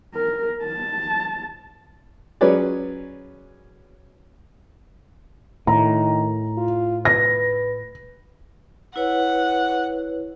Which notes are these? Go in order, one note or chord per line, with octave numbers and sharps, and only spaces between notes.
A#4
A5
F#3 C#4 G#4 B4 C#5 D5
A2 D#3 A#5
F4
B4 A#6
E4 B4 C#5 F#5